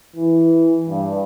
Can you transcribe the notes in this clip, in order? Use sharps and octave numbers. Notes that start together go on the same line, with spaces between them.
E3
G2